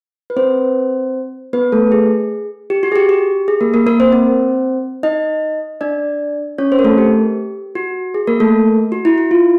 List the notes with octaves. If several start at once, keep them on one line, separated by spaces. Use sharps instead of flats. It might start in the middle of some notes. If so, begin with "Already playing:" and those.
B4
C4 C5
B3 B4
A3 A4
G#4
G4
F#4
G#4
G4
G4
G#4
A#3 A#4
A#3 A#4
A#3 A#4
C4 C5
C4 C5
D#4 D#5
D4 D5
C#4 C#5
C4 C5
A#4
A3 A4
G4
F#4
G#4
A#3 A#4
A3 A4
F#4
E4
E4
F4